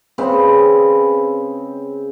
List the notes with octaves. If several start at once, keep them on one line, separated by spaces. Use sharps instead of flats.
C#3 G#3 C4 B4